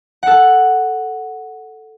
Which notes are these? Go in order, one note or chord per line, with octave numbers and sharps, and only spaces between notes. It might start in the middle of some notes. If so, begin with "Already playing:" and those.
A4 F#5